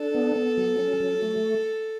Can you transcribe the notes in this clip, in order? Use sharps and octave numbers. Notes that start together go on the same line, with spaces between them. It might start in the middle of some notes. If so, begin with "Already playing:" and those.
Already playing: D4 A4
B3
B3
F#3
C#4
F#3
A3